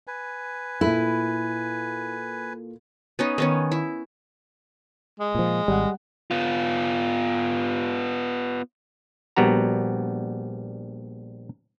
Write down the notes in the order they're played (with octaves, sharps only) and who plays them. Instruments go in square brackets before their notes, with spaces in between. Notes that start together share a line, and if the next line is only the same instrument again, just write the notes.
[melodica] B4 G#5
[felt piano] A#2 A4 [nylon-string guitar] E4
[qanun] B3 C#4 D#4
D#3 B3 C#4
E4
[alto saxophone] G#3
[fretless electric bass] A#2 F3
[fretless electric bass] G#1 [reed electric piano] G3 F#5
[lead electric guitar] B3 F4
[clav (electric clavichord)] A#1 G3 B3 F#4 A#5